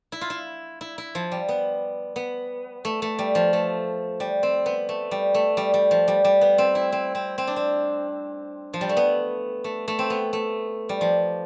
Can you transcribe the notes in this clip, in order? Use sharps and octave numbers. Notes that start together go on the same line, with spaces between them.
E4
F4
E4
E4
E4
F3
G3
B3
B3
A3
A3
G3
F3
A3
G3
C4
B3
A3
G3
A3
G3
G3
F3
G3
G3
B3
C4
E4
C4
C4
C4
D4
C4
F3
G3
A3
B3
A3
A3
C4
B3
A3
G3
F3